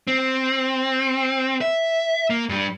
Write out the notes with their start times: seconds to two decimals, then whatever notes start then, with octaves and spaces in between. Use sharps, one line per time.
0.07 C4
1.61 E5
2.30 A#3
2.49 G2 G3